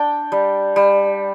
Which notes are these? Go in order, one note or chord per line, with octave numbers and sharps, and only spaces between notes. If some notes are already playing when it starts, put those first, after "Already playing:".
Already playing: D4 G5
G3
G3